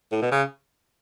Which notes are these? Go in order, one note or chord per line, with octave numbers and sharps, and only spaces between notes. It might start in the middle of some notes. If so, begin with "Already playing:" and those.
A2
B2
C#3